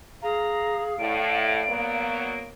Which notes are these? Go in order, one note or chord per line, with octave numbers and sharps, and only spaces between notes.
G#4 F5 A#5
A2 D5 D7
F#3 A#3 B3